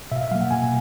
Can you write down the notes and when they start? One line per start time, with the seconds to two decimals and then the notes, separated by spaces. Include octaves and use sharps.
0.11 B2 E5
0.16 F5
0.22 E5
0.31 F#3 F5
0.35 A#3
0.41 F#5
0.51 B2 G#5